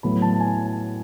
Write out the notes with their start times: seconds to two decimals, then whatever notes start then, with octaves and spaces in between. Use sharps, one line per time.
0.03 A2 F#3 B3 B5
0.22 A5
0.40 G#5